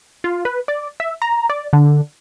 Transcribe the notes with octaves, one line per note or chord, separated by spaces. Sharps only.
F4
B4
D5
E5
A#5
D5
D3